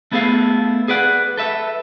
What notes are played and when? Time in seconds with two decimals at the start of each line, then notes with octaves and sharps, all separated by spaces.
0.12 A3 B3 E4 G#4 A4 F5
0.88 G#4 B4 D5 F#5
1.37 A4 B4 E5